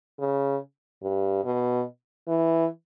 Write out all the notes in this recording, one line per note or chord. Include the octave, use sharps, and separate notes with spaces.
C#3
G2
B2
E3